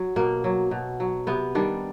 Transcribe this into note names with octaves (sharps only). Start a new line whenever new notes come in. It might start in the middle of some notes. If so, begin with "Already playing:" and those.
Already playing: F#3
B2 A#3
F#3
B2
F#3
C3 B3
D#3 G3 D4